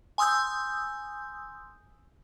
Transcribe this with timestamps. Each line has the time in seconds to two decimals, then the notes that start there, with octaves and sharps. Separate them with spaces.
0.18 G#5 C6 D#6 E6 G6